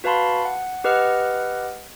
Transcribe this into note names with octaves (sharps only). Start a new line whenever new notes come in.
F#4 B4 F5 A5 B5 C6
F#5
G4 B4 D#5 F#5 F6